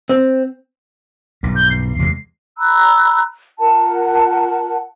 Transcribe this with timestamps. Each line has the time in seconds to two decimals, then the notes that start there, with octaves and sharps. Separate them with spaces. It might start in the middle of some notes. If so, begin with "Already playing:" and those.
0.09 C4
1.43 B1 G2
1.56 G6
1.71 C7
1.99 E2 C3 G#3
2.58 A#5 B5 E6 F#6
3.59 F4 A#4 F#5 A5